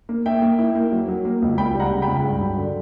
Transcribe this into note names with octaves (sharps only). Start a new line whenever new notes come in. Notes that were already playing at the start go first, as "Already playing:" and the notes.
A#3
A#3 E5 G5
A#3
E4
A#3
F#3
F#3
A#3
C#2
C#2 G5 B5
G3
F#5 A#5
C#3
G5 B5
C#2
G2
F#3
D3